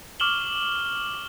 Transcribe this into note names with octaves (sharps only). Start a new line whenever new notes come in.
C#6 D6 F6 E7 F#7 G7